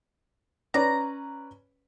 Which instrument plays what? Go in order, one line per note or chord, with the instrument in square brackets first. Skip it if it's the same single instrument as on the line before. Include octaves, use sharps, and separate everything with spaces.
[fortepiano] C#4 B4 D5 [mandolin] A#5